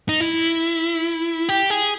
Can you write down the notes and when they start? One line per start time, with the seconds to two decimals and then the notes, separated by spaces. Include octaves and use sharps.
0.09 D#4
0.21 E4
1.49 G4
1.70 G#4